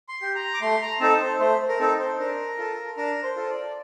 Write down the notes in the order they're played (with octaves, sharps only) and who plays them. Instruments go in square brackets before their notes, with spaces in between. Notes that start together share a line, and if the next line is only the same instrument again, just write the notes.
[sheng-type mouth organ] C6
G4
A#5
D6
A3 C6
A#5
C4 D#4 A4 A5
C5
A3 C5
A#4
C4 D#4 A4
C5
D4 A#4
F4 A4
D4 A#4
C5
F4 A4
D5